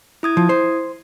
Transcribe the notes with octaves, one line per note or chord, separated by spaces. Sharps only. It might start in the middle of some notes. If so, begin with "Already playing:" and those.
E4 D#6 G#6
F3
C5